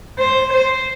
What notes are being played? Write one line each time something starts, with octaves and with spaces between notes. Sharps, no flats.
C5
C5